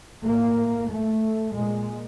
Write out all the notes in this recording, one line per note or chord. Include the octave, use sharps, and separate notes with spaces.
A2 A#3
A3
A#2 G#3